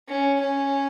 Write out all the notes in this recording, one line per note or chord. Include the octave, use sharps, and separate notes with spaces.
C#4
C#4